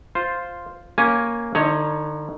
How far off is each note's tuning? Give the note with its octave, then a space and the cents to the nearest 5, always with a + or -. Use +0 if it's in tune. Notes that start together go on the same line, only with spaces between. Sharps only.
F4 +0 C5 +0
A#3 +0 C#4 +0 G#5 +0
D3 +45 D#4 +25 C#5 +0